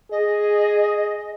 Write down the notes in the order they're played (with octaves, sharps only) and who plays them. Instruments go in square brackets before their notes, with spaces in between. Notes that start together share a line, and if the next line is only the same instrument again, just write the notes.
[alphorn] G#4 [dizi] D#5